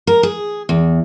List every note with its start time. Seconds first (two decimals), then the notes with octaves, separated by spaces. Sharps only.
0.07 A#4
0.23 G#4
0.69 E2